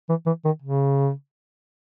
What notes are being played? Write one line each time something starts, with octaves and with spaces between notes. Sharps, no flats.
E3
E3
D#3
C#3